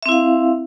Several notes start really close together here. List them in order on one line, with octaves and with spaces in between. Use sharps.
E5 C4 E4 F5